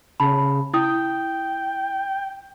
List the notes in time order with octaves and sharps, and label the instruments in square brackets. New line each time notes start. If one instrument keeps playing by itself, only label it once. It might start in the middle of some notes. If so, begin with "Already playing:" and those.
[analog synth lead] C#3 [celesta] A5 B5
[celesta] E4 D#6 [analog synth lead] G5